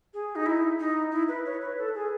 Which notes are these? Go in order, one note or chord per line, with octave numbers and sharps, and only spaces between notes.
G#4
D#4
E4
D#4
E4
B4
C#5
B4
A4
G#4